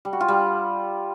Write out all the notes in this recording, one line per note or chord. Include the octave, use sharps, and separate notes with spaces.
G3
F#4
F4
G3